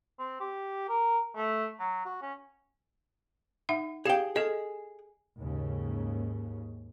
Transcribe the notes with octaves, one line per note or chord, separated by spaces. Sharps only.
C4
G4
A#4
A3
F#3
F#4
C#4
D#4 E5 F#5
G4 G#4 F5 G5
G#4 A4 D#5
D#2 G#2 C#3